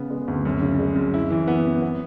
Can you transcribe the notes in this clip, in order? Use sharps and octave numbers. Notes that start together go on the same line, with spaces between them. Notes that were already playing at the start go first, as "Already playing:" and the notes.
Already playing: C#3 B3
G#3
D2
F#2
C#3
G#3
F#2
E4
E3
B3
F#2
B3